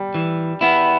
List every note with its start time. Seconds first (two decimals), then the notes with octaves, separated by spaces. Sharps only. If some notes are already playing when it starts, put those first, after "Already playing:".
Already playing: G3
0.14 E3
0.61 B3 E4